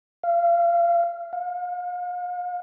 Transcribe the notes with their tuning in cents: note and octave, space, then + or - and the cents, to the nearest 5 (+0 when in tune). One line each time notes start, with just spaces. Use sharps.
F5 -30
F5 +40